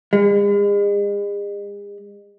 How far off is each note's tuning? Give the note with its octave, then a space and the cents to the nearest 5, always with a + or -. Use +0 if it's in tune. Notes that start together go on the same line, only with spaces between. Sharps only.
G#3 -40